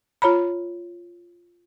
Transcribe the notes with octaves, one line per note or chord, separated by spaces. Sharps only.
F4 C#5 A#5 B5